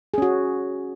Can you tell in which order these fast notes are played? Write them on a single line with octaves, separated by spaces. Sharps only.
G#4 C#4 F#4